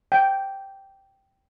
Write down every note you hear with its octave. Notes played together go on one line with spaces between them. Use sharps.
G5